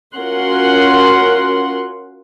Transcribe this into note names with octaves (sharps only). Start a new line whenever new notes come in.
C#4 F4 F#4 A#4 F#5 C6